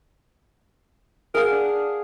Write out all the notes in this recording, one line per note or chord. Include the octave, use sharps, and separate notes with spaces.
G#4 A#4 F5 F#5
D4